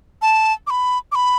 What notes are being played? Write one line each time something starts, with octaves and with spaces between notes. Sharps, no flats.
A5
D6
B5
D6
B5